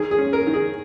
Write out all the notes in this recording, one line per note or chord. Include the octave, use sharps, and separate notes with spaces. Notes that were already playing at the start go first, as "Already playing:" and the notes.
Already playing: D#3 G#4
G#4
C#4
A#4
D#3
G#4